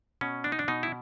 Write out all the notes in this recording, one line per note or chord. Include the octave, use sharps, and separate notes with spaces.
B2 C#4
D4
D#4
D4
B2 D#4
E4